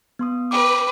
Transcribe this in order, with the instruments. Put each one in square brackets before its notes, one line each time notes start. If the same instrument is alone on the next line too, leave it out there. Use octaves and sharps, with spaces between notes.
[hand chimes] B3 C6 D#6
[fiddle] B4 [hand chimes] G5 D6